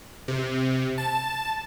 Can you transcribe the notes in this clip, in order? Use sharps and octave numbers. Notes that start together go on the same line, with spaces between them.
C3
A5